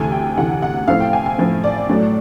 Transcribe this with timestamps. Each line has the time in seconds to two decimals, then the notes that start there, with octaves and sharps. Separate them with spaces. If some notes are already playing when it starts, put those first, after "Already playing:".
Already playing: D2 C3 E3 A3 G#5
0.12 G5
0.37 D2 C3 E3 A3 F#5
0.62 F#5
0.88 A2 F3 A3 C4 E4 F5
1.00 G5
1.13 G#5
1.26 G#5
1.38 A2 F3 A3 C4 E4
1.64 D5
1.89 A2 F#3 A3